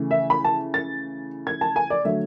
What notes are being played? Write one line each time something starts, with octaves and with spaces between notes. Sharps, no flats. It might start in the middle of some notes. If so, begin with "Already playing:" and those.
Already playing: C#3 E3 A3
E5
B5
A5
A6
G#6
A5
G#5
D5
D3 F#3 A3 E5